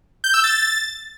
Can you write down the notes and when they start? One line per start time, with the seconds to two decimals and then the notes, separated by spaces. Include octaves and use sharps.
0.24 G6
0.34 E6
0.44 A6